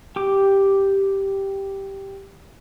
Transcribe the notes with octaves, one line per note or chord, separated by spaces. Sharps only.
G4 D6